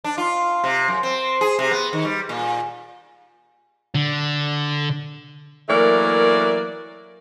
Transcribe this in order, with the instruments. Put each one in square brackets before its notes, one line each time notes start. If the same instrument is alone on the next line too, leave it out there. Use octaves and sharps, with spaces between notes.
[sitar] D4
F4
C3
F#2
C4
G#4
C3
B3
D#3
G3
A#2
[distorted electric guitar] D3
[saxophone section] E3 F#3 A3 A#3 A#4 D5